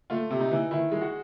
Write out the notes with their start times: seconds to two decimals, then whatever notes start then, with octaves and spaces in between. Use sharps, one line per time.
0.10 A3 F4
0.31 C3
0.41 D#4
0.51 E3
0.71 D#3 E4
0.92 G#3
1.01 F#4